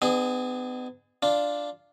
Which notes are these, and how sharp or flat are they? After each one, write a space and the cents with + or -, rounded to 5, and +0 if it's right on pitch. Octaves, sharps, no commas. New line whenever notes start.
B3 +35 D#4 -45 G#4 -10
D4 +0 F4 +0